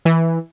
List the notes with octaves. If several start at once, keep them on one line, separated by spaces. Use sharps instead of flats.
E3